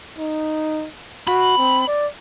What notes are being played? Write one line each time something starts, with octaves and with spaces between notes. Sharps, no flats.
D#4
F#4 B5
C4
D5